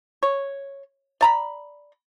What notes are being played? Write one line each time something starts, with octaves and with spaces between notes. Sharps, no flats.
C#5
D5 A#5 B5